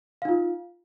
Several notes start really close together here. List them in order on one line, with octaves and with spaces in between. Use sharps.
F5 D#4 F4